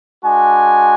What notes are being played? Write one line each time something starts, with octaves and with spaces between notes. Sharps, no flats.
G#3 D4 F#4 G#5